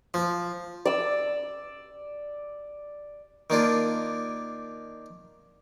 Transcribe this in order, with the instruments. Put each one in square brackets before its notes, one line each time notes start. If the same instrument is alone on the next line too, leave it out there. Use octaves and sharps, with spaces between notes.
[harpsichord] F3
[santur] D5 E6
[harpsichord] D#3 A#3 D4 F4